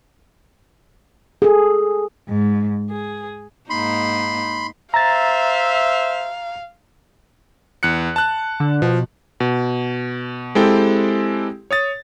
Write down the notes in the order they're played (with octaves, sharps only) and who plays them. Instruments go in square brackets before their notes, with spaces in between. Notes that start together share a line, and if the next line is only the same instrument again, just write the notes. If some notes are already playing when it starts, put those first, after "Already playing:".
[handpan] G#4 A4
[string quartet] G#2
G#4
[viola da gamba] G#2 A#3 D#4 [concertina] B5 C6
[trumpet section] C5 E5 [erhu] F5 [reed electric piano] A#5 A6
[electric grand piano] E2 F#6 C#7
A5 F#6
[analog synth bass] D3
[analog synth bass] B2 [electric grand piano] F3
[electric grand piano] B2
G#3 C4 E4 G4 A4 G5
C#5 D#6 A6